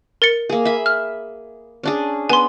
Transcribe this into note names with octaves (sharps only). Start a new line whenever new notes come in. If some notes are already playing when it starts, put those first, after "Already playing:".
A#4 A6 C#7
A#3 G#4
E5 B5
F6
C#4 D4 G#4
B3 G#5 C6